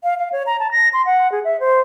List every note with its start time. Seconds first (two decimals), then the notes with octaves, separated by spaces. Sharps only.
0.04 F5
0.18 F5
0.32 C#5
0.46 A#5
0.60 A5
0.72 A#6
0.93 C6
1.06 F#5
1.32 G#4
1.44 E5
1.60 C5